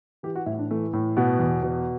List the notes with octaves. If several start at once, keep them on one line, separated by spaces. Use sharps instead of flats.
E3 G4
F#4
A2 E4
D4
E3 A3
A2
B2 B3
E2
B2